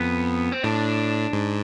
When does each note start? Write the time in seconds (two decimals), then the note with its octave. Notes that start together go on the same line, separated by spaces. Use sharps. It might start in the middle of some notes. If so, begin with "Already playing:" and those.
Already playing: F2 B3
0.52 C4
0.63 A2 D4
1.33 G#2